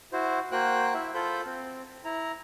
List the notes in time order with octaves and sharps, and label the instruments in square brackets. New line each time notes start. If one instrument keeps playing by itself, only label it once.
[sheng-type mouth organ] E4 F#4 C5
A#3 F#4 C5 G5 F#6
E4 E5
F4 A4 C5 B5 G6
C4
E4 A#5